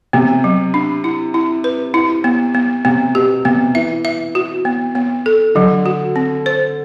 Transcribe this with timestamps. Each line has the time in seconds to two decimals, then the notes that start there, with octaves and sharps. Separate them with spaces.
0.13 C3 B3
0.44 F#3
0.74 D4
1.04 E4
1.34 E4
1.64 B4
1.94 E4
2.24 B3
2.54 B3
2.85 C3 B3
3.15 B2 G4
3.45 C3 B3
3.75 E3 E5
4.05 E5
4.35 F#4
4.65 B3
4.95 B3
5.26 A4
5.55 D3 F#3
5.86 F#4
6.16 C4
6.46 C5